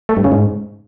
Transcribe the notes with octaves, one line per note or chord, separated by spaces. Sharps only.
A3
G2
C#3
G#2